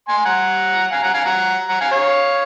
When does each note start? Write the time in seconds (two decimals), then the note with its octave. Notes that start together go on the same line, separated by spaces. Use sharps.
0.08 G#5 C6
0.25 F#5 A#5
0.92 F5 G#5
1.03 F#5 A#5
1.14 F5 G#5
1.25 F#5 A#5
1.69 F#5 A#5
1.81 F5 G#5
1.91 C#5 F5